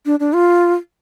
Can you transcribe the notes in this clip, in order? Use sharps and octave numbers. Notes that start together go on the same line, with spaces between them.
D4
D4
F4